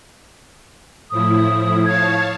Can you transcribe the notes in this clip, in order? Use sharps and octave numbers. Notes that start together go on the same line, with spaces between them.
A2 F3 E4 D#6
C#5 F5 A5 G#6